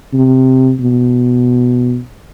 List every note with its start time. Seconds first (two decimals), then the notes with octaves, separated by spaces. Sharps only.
0.13 C3
0.80 B2